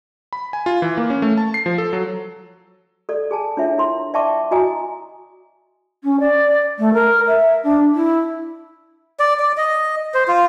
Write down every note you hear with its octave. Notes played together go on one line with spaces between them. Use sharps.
B5
G#5
F4
E3
A#3
C#4
A3
A5
C7
F3
A4
F#3
A4 D5
G#4 G#5 A5
D4 E4 F4 C#5 E5
E4 A#4 C6
D5 E5 G5 A5 C#6 D6
E4 F#4 D#5 G#5 A#5 D#6
C#4
D5
A3
A#4
E5
D4
E4
D5
D5
D#5
C5
F4